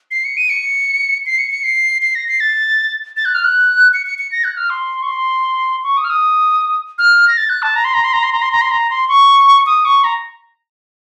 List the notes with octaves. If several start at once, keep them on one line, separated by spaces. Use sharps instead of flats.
C7
C#7
D#7
C#7
C7
C#7
C#7
C7
C7
A#6
C7
A6
A6
F#6
F6
F#6
C#7
C#7
C#7
A#6
F#6
F6
C6
C#6
C6
C#6
D#6
F6
D#6
F6
A#6
A6
F#6
A5
A#5
C6
A#5
C6
A#5
C6
A#5
C6
A#5
C6
A#5
C6
C#6
D#6
C#6
A#5